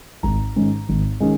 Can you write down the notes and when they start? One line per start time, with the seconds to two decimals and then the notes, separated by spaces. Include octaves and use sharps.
0.23 G#1 A#5
0.56 G#2 D#3 G#3 C#4
0.89 G#1
1.20 D#3 G#3 C#4